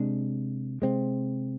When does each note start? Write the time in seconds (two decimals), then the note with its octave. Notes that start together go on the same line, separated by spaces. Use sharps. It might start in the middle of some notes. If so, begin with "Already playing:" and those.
Already playing: C3 G#3 D4
0.82 C3 G#3 C4